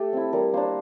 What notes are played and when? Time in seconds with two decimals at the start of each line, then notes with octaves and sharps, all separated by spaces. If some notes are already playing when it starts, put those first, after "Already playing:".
Already playing: A3 G4 A4 G5
0.13 C4 E4
0.33 G3 A#4
0.53 A#3 D4 C5